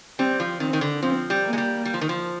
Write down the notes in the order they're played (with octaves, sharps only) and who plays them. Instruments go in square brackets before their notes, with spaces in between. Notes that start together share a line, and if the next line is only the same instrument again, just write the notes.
[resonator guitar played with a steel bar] G3 [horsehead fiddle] C4
[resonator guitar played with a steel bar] F3
[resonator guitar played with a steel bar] D#3 [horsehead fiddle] C4
[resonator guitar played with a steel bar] D#3
D3
[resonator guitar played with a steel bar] F3 [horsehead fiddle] C4
[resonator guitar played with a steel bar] G3
[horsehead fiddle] A#3
[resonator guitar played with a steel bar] G#3
G3
G3
F3
D#3
F3